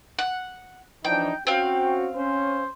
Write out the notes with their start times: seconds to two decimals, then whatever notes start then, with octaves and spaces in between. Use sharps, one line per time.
0.19 F#5
1.05 E3 F3 D4 D#4 G5
1.47 C4 C#4 F#4 F5 G5
2.16 C#4 C5